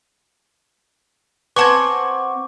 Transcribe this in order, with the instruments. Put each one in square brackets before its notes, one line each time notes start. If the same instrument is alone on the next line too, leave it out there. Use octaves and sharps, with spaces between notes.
[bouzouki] C4 F#5 G#5 [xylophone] B4 A5 G#6 [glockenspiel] C#6 D6